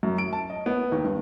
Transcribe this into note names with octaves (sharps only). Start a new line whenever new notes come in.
F#2
D7
A5
D#5
B3
D#2
G2